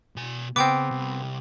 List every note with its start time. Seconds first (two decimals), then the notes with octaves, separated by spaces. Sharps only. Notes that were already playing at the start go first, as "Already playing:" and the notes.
0.16 B2 G#5
0.56 C#3 B3 C4 G5 D6
0.91 C2